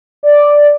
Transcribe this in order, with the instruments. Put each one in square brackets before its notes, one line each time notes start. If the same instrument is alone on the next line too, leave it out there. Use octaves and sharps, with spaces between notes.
[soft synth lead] D5